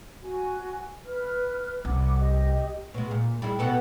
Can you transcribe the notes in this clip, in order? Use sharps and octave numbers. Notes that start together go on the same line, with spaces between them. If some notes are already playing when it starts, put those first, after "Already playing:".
F#4 G#5
B4 F6
C2 F#5 D6
G4 D#5
B2 G#3
A#2
G3 G#3 E4
B2 B3 A4